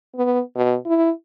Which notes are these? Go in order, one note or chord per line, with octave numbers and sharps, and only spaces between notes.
B3
B2
E4